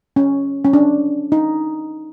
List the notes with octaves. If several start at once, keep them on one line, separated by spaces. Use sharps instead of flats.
C#4
C#4
D4
D#4